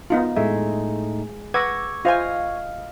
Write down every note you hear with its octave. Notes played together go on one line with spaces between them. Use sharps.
B3 D#4 F4
A2 G#3 A3 D#4 E5
B4 F#5 C#6 D6 E6 G#6 A#6
F4 C5 D#5 F5 G#5